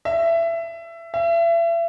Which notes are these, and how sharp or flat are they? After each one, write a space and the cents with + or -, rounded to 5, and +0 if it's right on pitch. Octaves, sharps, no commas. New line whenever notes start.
E5 +20
E5 +35